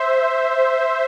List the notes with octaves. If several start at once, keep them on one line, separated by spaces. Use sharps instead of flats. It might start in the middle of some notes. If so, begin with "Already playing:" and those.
Already playing: C5 E5